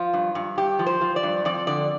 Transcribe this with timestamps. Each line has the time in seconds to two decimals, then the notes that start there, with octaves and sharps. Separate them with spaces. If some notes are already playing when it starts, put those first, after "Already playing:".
Already playing: F3 F4
0.13 G2
0.35 G2
0.57 G2 G4
0.79 F3
0.86 C5
1.01 F3
1.16 D5
1.23 G2
1.45 F2 D5
1.67 D3 D5